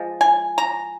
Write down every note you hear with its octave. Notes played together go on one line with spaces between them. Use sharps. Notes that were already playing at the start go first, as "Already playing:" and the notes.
Already playing: F3 G#3
G#5
A#5